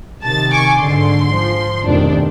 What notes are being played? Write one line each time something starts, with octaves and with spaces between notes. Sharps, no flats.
C3 D#3 A5 A6
G#5 C#6 D6
G#2 D3 C6
F3
F1 B2 D#3 D4